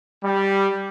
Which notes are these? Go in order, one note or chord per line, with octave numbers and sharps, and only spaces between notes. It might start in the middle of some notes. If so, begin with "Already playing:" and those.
G3